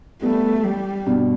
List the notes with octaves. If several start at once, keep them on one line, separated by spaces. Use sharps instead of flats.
G3 A3 B3
G3
G2 B2